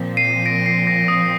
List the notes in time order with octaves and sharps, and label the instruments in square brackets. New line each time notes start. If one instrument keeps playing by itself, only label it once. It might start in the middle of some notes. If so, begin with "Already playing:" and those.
Already playing: [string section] A#2 F3 C4
[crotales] C7 D#7
A#6 D7
C7
A#6
D#6